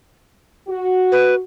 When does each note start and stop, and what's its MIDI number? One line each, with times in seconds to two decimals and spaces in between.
0.68 1.41 66
1.12 1.35 71